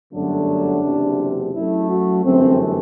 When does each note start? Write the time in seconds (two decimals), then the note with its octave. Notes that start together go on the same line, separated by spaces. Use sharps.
0.13 G1 F#2 D3 F#3 A3 D4
0.84 F#1 E2 C3
1.54 F#2 F#3 A3 E4
1.90 F#4
2.24 G1 F#2 E3 A3 C4